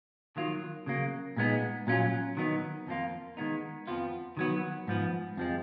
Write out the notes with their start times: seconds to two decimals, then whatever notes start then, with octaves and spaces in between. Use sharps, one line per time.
0.37 D#3 F#3 A#3 F4
0.86 C#3 F#3 A#3
1.37 A#2 G#3 B3 D#4
1.87 A#2 F#3 C#4 F4
2.37 D#3 F#3 B3 D#4
2.87 F2 F3 A#3 F4
3.37 D#3 G#3 B3 D#4
3.87 F2 F3 B3 F4
4.37 D#3 F#3 B3
4.87 G#2 F3 B3
5.37 F2 F3 G#3